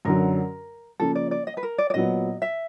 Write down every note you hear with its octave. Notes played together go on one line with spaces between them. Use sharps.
F#2 D3 F#3 A#4
C#3 F3 A#3 A4
D5
D5
D#5
B4
A#4
D5
D5
A#2 F#3 B3 D#5
E5